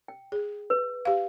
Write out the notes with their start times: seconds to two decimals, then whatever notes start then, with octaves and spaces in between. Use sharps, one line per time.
0.08 G5
0.32 G#4
0.70 B4
1.05 G4 F5